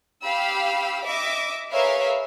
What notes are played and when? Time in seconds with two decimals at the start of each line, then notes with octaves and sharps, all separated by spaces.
0.24 G4 F5 B5 E6
1.06 D#5 E5 D6
1.73 G#4 A#4 B4 C#5 E5 F5